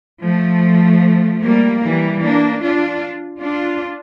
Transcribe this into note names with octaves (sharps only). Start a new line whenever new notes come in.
F3 A3
G3 A#3
E3 G3
A#3 D4
D4 F4
D4 F4